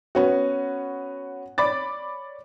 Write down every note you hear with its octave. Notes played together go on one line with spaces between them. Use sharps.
B3 C#4 F#4
C#5 D5 B5 D6 A6